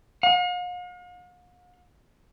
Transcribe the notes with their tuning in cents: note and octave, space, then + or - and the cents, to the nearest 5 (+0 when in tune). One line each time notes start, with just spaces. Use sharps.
F5 +45